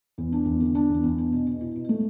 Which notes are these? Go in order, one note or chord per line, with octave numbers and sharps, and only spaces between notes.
E2
D4
E2
D3
D4
E2
E2
D4
B2
B2
E4
B2
A3